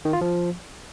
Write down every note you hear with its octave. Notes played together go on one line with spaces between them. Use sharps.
D#3
F4
F3